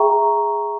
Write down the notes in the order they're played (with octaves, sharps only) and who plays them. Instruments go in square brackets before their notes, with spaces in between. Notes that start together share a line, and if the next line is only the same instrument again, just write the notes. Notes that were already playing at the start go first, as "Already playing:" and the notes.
Already playing: [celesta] G#4 E5 G5 A#5 C#6